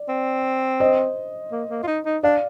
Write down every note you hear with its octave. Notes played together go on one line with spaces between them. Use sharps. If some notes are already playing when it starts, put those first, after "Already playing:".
Already playing: D5
C4
C5 D#5
A#3
A#3
F4
D#4
D#4
D4 D5 F5